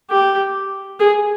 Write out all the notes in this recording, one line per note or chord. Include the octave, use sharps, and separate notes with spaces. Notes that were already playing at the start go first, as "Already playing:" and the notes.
G4
G#4